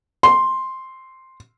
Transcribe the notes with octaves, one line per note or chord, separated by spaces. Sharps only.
C6